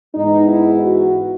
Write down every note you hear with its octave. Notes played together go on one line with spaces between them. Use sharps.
G#2 E3 G#3 B3 D#4
E4
F#4